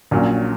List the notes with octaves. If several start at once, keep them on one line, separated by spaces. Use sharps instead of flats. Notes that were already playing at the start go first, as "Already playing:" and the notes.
A#1 A#2 F#3 C#4